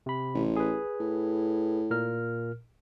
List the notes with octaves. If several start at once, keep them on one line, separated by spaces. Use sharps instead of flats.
C3 B5
A1
G#4 B4
A2
A#2 A#4 F6